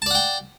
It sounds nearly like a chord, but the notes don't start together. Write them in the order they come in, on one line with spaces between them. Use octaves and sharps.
A5 D5 F#5 G5